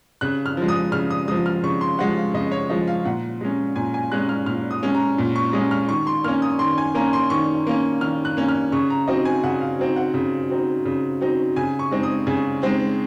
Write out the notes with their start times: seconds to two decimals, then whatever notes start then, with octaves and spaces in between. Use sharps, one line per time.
0.21 C#3 F#6
0.46 F6
0.57 F3 G#3
0.68 D#6
0.92 C#3 F6
1.11 D#6
1.28 F3 G#3 D#6
1.46 F6
1.63 C#3 C#6
1.81 C6
1.99 F3 G#3 F#5
2.17 F5
2.34 C#3 D#5
2.52 C#5
2.69 F3 G#3 D#5
2.87 F5
3.05 A#2 F#5
3.41 G#3 C#4
3.76 A#2 G#5
3.94 G#5
4.12 G#3 C#4 F#6
4.29 F6
4.46 A#2 F6
4.71 D#6
4.83 G#3 C#4
4.95 A#5
5.18 A#2
5.36 C#6
5.53 G#3 C#4 D#6
5.71 F6
5.89 D#3 C#6
6.07 C6
6.24 A#3 C#4 F6
6.42 D#6
6.59 D#3 C6
6.78 G#5
6.95 A#3 C#4 A#5
7.13 C6
7.30 D#3 C#6
7.67 A#3 C#4
8.01 D#3 F6
8.25 F#6
8.37 A#3 C#4
8.49 F6
8.72 C#3 C#6
8.90 A#5
9.08 F#3 C4 D#4 D#5
9.25 G#5
9.43 C#3 F#5
9.61 F5
9.79 F#3 C4 D#4
9.96 F#5
10.14 C#3
10.49 F#3 C4 D#4
10.85 C#3
11.21 F#3 C4 D#4
11.56 C#3 G#5
11.79 C#6
11.91 G#3 C4 D#4
12.03 D#6
12.27 C#3 G#5
12.62 G#3 C4 D#4